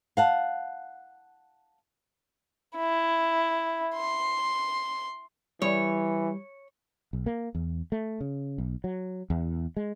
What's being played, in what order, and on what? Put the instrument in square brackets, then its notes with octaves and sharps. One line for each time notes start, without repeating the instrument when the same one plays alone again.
[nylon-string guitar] F5 F#5 A5
[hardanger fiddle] E4
C6
[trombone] E3 [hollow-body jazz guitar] G3 [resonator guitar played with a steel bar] C#5
[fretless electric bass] B1
A#3
E2
A3
C#3
B1
F#3
E2
G#3